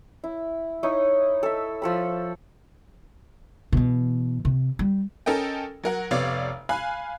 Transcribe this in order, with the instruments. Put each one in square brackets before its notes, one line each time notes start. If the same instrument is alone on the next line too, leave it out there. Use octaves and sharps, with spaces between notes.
[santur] E4
D#4 E4 C#5 D#5
A4 E5
F3 A4 B5
[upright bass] B2 E3
C3
G3
[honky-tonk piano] C#4 A4 A#4 D#5 G5
F#3 A#4 F#5
F1 C3 B3 C#5 D5 F5
F5 G#5 B5 F#6